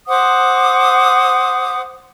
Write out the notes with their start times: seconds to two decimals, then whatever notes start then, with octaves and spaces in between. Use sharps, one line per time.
0.07 C5 F#5 D6 D#6